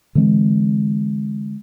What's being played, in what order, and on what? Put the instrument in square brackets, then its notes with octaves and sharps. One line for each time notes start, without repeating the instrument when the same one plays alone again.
[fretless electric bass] D3 E3 G#3 C4